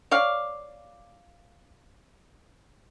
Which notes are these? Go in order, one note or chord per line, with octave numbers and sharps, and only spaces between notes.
C#5 D5 F5